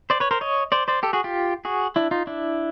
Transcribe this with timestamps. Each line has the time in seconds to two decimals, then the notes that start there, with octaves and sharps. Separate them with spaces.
0.10 C5 D5
0.20 B4 C#5
0.31 A#4 C5
0.41 C#5 D#5
0.72 C5 D5
0.88 C5 D5
1.03 G4 A4
1.13 F#4 G#4
1.24 F4 G4
1.65 F#4 G#4
1.96 D4 E4
2.11 D#4 F4
2.27 D4 E4